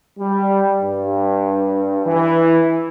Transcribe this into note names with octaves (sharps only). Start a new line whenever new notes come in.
G3
G2
E3